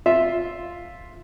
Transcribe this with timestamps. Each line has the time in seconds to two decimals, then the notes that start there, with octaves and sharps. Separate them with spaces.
0.06 F4 E5